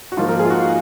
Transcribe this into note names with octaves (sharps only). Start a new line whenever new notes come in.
F#4
G#2 F3 A#3 F4
A#4
G#4
F4
F#4